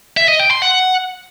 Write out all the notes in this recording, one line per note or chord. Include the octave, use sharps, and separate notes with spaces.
E5
D#5
G5
C6
F#5